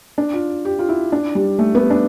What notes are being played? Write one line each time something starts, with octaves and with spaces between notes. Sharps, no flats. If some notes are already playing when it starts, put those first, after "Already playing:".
D4
F4
G4
F4
E4
D4
G3
A3
B3
D4